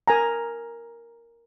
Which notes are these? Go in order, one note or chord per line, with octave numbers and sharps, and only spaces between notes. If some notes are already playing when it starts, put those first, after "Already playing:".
A#4 G#5 A#5